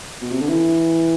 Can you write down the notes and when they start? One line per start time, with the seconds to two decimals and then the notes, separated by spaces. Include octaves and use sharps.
0.22 B2
0.31 C3
0.41 D3
0.49 E3